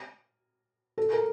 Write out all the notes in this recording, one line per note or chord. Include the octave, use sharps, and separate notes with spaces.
A4
A#4